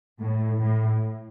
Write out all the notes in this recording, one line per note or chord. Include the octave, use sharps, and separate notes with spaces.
A2
A2